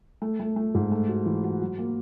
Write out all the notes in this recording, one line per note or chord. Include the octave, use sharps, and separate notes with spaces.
A3
A3
A3
G#2
A3
F#4
E3
F#4
F#3
A#3